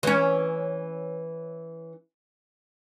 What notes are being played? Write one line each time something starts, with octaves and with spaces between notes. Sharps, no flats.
E3 C#4